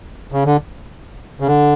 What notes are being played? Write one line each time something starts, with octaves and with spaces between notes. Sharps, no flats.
C#3
D3
C#3
D3